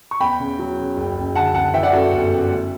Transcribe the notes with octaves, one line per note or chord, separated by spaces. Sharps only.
C#6
E2 G5 B5
C#3
F#3
C#3
F#1
F#1
D3 F#5 A5
F#1 F#5 A5
E3 E5 G5
D5 F#5
F#2 F#4 A4
G1
C#3
A3